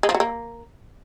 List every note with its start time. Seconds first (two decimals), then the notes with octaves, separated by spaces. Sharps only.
0.03 G#3
0.09 F3
0.15 F#3
0.20 A#3